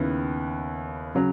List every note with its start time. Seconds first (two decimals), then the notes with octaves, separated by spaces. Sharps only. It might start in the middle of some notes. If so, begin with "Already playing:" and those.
Already playing: D#2 C#3 B3 E4
1.15 C#3 F#3